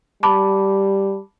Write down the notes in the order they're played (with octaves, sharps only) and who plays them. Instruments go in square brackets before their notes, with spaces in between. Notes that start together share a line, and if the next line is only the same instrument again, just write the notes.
[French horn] G3 [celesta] A5 B5 D6